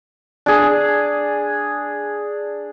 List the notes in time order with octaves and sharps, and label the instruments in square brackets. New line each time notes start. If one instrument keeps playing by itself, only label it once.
[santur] D4 G#4